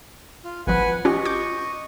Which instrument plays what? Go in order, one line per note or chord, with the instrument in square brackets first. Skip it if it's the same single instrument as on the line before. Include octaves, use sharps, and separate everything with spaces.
[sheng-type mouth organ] F4
[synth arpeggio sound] G#1 F3 [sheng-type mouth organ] B4 F#5 G#5
[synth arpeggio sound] C#4 F4 G4 [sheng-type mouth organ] D#5 C#6
[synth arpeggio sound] D6 G6